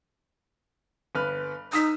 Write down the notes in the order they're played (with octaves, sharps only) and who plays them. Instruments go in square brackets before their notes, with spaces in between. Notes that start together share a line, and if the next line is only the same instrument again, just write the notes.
[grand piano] G1 B4 F6
[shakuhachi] D#4 [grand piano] D#6 E6 B6